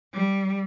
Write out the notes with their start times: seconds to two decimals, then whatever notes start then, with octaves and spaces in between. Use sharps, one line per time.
0.14 G3